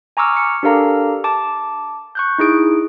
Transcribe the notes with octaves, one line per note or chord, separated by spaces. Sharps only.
G#5 A#5 C#6 D6 E6 F6
C#7
D4 G4 A4 A#4 F5 A#5
A5 D6
C#6 F#6 G6
D#4 E4 G#4 D7